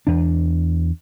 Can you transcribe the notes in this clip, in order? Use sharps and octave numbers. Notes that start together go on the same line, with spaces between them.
E2 D4